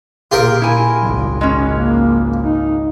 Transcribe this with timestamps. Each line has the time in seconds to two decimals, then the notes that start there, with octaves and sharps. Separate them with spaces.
0.32 A#2 F4 G4 G#4 A#4
0.62 E4 G#5
1.02 G#1 C#2
1.41 G#3 C#4
1.72 A#3
2.43 D#4